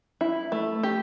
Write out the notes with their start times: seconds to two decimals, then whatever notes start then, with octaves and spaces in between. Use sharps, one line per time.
0.21 E4
0.52 A3
0.83 G4